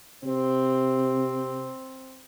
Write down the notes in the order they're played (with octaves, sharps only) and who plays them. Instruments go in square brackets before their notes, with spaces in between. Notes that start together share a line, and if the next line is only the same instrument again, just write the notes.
[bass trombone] C3 [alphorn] C4